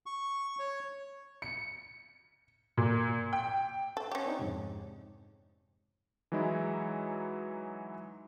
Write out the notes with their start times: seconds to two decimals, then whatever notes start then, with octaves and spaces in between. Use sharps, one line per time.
0.06 C#6
0.59 C#5
1.42 C#7
2.77 A#2
3.33 G5
3.97 A4
4.12 C#4 G4 C#5
4.26 C4 D4 D#4
4.39 F2 G#2 C3
6.32 E3 F#3 G#3 D#4 E4